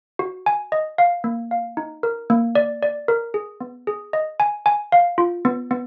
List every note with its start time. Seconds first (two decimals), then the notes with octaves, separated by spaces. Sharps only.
0.19 F#4
0.46 G#5
0.72 D#5
0.98 F5
1.24 A#3
1.51 F5
1.77 D#4
2.03 A#4
2.30 A#3
2.55 D5
2.83 D5
3.08 A#4
3.34 G#4
3.61 B3
3.87 G#4
4.13 D#5
4.40 G#5
4.66 G#5
4.92 F5
5.18 F4
5.45 B3
5.71 B3